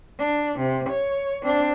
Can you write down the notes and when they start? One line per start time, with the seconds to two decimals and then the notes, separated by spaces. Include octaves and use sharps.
0.19 D4
0.59 C3
0.90 C#5
1.44 C4 D4